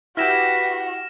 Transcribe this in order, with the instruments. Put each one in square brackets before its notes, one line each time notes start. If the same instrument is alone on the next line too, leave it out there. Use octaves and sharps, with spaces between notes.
[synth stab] E4 G4 [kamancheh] F#4 [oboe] B4 [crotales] F6 A#6 E7